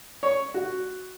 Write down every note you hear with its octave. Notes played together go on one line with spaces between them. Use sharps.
C#5
F#4